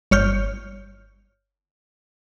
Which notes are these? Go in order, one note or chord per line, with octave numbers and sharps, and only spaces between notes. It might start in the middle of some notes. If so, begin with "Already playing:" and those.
G1 C#5 F6 G6